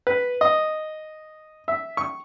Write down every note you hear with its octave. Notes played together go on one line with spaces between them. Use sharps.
B4
D#5
E5
C#6